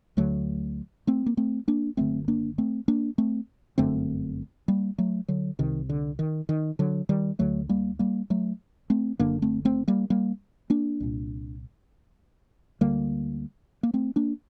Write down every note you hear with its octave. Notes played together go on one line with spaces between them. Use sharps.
D2 D3 F#3 A3
A3 C4
A#3
A3 C4
A#3 D4
F#1 F#2 D3 A3 C4
A#3 D4
A3 C4
A#3 D4
A3 C4
G1 F#2 D3 A3 C4
G3 A#3
F#3 A3
D3 F#3
C2 C3 D#3
D3
D#3
D#3
D3 F#3
D#3 G3
D2 D3 F#3 A3
G3 A#3
G3 A#3
F#3 A3
A3 C4
F#1 F#2 D3 A#3 D4
A3 C4
A3 C4
G3 A#3
G3 A#3
A#3 D4
C2 A#2
D2 D3 G3 A#3
A#3
A3 C4
A#3 D4